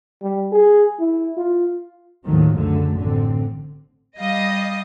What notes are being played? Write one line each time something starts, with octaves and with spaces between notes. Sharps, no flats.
G3
G#4
E4
F4
D#2 A2 D#3 F3 F#3
C#2 F#2 D3 A3
A1 D3 C4
G3 D#5 F5 D#6